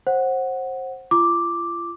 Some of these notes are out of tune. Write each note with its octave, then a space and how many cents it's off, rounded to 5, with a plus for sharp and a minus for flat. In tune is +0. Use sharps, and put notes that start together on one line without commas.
C5 +25 F#5 +0
F4 -40 D6 +0